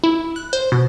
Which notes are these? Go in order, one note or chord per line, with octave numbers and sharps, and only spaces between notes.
E4
F#6
C5
B2